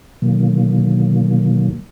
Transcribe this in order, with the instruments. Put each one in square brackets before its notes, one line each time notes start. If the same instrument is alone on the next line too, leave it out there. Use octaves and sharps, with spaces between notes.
[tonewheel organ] B2 D3 D#3 F#3 A#3